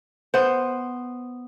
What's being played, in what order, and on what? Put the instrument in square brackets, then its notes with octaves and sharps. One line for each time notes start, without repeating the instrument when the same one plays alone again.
[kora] B3 C5